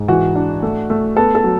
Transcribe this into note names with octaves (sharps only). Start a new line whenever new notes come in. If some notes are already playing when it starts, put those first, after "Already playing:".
Already playing: G#2
E3 F#4
D4
A3
A3
B3 A4
A4
F#3